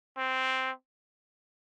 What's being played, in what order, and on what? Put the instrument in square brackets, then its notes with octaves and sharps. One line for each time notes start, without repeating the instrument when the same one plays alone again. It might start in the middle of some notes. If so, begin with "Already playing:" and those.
[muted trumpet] C4